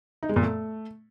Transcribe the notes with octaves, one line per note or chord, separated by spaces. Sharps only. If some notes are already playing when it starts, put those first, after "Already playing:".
D#4
G#3
A#2
A3